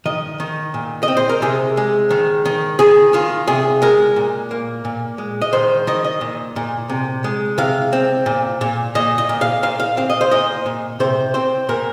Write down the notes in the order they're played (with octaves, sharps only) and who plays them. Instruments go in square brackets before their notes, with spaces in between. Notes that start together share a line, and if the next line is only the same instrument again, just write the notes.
[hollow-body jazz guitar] D#3 D#5
D#3
A#2
D#5
C4
C5
A#4
C3 G#4
G#3
D#3
D#3
D#3 G#4
D#3 F4
C3 G#4
G#3 A#4
A#2
A#3
A#2
G#3
D#5
D#3 C5
D#3 D#5
D#5
A#2
A#2
C3
G#3
C3 F5
C4
A#2
A#2
A#2 D#5
D#5
A#2
F5
A#2 F5
F5
C4 F5
D#5
C5
A#2 D#5
A#2
C3 C5
C4 C5
A#2 A#4